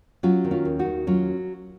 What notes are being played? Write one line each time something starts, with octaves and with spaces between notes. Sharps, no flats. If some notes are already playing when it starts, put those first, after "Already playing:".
F#3 C#4 F4
D#3
C#4 F4
D#2
D#4 F#4
D#2
F#3 C#4 F4